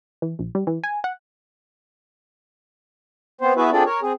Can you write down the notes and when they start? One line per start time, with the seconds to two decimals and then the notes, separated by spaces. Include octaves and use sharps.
0.22 E3
0.39 A#1
0.55 G3
0.67 E3
0.84 G#5
1.04 F#5
3.41 B3 C4 C5
3.57 B3 E4 F#4 G#4 B4 E5
3.72 C4 D4 F4 G#4 A4 D5
3.86 A#4 C#5
4.02 C4 G#4